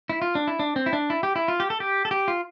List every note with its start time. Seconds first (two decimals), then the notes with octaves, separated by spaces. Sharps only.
0.09 E4
0.22 F4
0.35 D4
0.47 E4
0.59 D4
0.76 C4
0.86 E4
0.93 D4
1.10 E4
1.23 G4
1.36 E4
1.48 F4
1.60 G4
1.70 A4
1.80 G4
2.05 A4
2.11 G4
2.28 F4